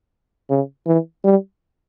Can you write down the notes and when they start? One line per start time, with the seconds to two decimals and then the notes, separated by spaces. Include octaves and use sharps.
0.50 C#3
0.86 E3
1.24 G3